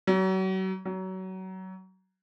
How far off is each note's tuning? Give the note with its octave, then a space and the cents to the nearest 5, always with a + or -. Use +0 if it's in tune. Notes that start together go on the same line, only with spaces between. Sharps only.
F#3 +35
F#3 +25